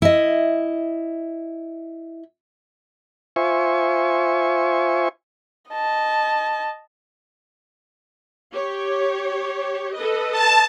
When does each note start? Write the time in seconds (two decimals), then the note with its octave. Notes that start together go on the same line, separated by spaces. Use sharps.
0.02 E4 D#5
3.36 F4 C5 E5 G#5 C#6
5.71 D#5 A5
8.53 G4 C#5
9.95 A4 B4 D#5
10.31 A5